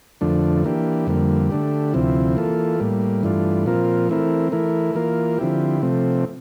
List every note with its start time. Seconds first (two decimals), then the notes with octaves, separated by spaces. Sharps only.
0.21 F2 D3 F3 A3 D4
0.64 E3 A#3 D4 G4
1.07 F2 D3 G3 A#3
1.50 D3 A3 D4 G4
1.93 D2 C3 F3 C4 E4
2.36 E3 A#3 F4 A4
2.80 A2 G3 A#3
3.23 G2 E3 A3 D4 F4
3.66 A#2 F3 C4 F4 A#4
4.09 E3 A3 C4 E4 A#4
4.52 E3 A3 E4 A#4
4.95 E3 A#3 F4 A#4
5.38 D3 F3 C4 E4 G4
5.82 C3 F3 A3 C4